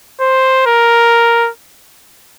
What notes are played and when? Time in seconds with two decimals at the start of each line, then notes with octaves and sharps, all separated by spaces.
0.20 C5
0.66 A#4